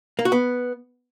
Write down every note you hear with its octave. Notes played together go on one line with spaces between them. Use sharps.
A#3
F#4
B3